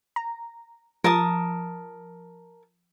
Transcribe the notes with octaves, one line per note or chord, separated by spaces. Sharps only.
A#5
F3 A#4 A5 D#6